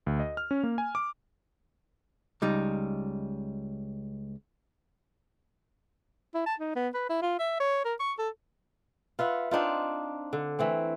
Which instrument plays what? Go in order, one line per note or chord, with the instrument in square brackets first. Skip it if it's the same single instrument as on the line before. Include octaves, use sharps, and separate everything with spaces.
[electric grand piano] D2
D#5
F6
C#4
A#3
G#5
D6
[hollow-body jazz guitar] C#2 G3 D#4
[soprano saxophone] E4
A5
D#4
B3
B4
E4
F4
E5
C#5
A#4
C#6
A4
[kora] F4 B4 E5 F#5
C4 D4 D#4 F4
D3
E3 A3 C4